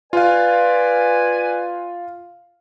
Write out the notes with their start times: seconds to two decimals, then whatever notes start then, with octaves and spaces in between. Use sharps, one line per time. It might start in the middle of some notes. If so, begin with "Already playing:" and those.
0.13 F4 B4 D5 F5 G#5